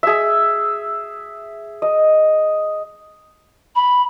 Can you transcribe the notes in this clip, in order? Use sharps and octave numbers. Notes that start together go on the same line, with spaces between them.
G#4 E5
D#5
B5